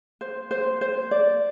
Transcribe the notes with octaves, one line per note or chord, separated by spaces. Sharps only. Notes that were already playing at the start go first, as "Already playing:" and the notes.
C5
C5
C5
D5